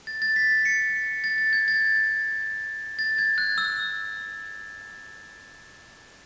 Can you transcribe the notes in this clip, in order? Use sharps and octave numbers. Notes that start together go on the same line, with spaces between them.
A6
A6
B6
A6
C#7
A6
A6
G#6
A6
A6
G#6
F#6
E6